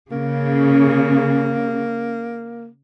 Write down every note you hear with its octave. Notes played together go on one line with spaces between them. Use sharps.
C#3 A#3